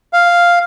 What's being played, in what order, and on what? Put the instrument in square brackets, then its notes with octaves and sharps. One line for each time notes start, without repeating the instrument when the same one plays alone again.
[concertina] F5